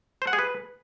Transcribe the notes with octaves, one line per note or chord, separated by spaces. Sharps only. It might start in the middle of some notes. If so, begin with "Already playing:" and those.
C5
F#5
G#4
B4